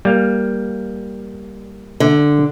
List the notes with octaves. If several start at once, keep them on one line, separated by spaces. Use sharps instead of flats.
G3 A#3 F5
D3